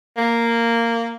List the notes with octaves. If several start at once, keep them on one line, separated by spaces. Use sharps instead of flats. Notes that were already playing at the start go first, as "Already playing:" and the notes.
A#3